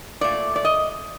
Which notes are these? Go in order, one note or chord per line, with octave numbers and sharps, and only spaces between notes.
A#2 A3 D5
D5
D#5